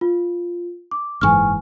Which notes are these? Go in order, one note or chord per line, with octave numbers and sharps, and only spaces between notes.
F4
D6
F#1 G#2 E3 G#5 C#6 F6